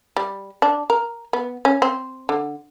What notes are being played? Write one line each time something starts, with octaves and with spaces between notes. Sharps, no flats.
G3
D4
A#4
B3
C#4
C4
D3